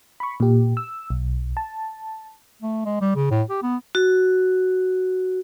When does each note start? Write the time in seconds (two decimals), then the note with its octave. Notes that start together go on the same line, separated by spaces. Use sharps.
0.20 B5 C#6
0.40 A#2 G4
0.77 E6
1.10 B1
1.57 A5
2.62 A3
2.85 G#3
3.01 G3
3.15 C#3
3.31 A2
3.50 G4
3.63 B3
3.95 F#4